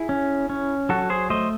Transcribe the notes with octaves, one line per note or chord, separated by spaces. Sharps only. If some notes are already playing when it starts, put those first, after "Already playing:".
Already playing: E4 G#4
C#4
C#4
F#3 F#4 A4
G#4 C5
A3 C5 D#5